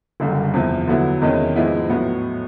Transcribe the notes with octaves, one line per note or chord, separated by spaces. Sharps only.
F#1 F#2 D3 G3
E2 C3 F3
D3 F#3 B3 E4
E2 C3 D#3 G#3 C#4
G#2 F3 G#3 B3 E4
A2 F#3 B3